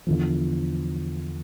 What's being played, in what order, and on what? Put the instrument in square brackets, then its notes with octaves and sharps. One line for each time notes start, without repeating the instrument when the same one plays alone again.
[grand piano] E2 D3 F3